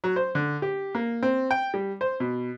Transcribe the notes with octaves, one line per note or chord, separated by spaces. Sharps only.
F#3
C5
D3
G4
A#3
C4
G5
G3
C5
B2